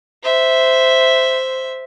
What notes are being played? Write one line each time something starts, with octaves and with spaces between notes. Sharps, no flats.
C5 E5